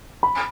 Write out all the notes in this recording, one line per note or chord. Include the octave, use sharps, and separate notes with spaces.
B5